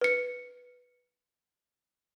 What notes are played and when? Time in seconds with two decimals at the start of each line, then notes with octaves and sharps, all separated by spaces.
0.01 B4 C#7